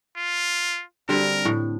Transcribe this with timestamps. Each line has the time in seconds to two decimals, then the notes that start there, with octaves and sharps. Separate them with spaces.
0.17 F4
1.09 D3 G3 C4 A#4
1.45 A2